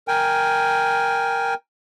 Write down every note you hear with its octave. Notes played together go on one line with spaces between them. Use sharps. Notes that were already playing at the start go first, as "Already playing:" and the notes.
A#4 G5 G#5